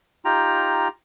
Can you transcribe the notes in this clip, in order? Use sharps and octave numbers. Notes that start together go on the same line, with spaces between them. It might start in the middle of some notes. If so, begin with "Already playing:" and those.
D#4 F4 G4 G5 A#5